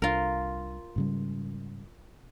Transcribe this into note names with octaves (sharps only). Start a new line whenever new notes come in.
C2 D4 F4 A#4
G#2 C#3 G3